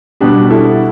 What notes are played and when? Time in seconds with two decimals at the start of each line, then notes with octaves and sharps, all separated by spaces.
0.21 B2 G3 B3 D4 G4
0.50 E4 A4